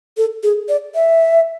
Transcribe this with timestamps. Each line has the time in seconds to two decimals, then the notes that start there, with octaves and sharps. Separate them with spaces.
0.17 A4
0.43 G#4
0.69 D5
0.95 E5